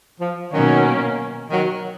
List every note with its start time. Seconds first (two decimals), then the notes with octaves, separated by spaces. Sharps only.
0.19 F3
0.52 B2 D#3 F#3 A#3 C#4
1.51 D#3 F#3